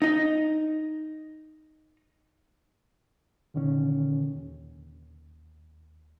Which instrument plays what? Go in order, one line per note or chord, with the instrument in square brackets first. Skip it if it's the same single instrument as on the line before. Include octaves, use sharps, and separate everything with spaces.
[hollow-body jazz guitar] D#4 D#5
[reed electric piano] C2 A#2 D3 D#3 C#4
D#2